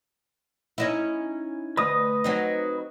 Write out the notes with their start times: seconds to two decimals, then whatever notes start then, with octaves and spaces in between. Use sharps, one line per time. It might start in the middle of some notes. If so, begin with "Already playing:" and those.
0.78 C#4 D#4 E4
1.77 D2 B4 D#5 D#6
2.24 F#3 C4 D#4